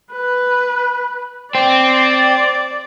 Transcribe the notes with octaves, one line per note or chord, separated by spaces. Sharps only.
B4
C4 D5